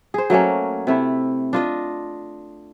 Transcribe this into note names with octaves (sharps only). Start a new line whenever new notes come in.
G#4 C5
F#3 A3 A#3 C#4
C3 A3 E4
D4 F4 D#5